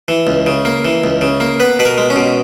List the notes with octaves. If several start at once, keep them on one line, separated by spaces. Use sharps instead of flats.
E3
C#2
C#3
A#3
E3
C#2
C#3
A#3
B3 B4
B2 B4
A#4
G#3
C#4
B2